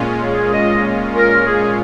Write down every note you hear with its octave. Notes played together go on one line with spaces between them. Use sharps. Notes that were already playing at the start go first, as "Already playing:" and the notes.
Already playing: A#2 G#3 C#4 F4
G#4
D#5
A#4
G#4